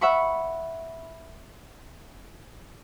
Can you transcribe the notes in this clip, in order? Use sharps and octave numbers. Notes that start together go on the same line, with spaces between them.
E5 F#5 B5 C#6